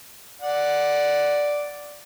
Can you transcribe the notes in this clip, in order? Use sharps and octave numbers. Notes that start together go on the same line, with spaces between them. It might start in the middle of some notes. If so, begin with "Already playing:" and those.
D5 F#5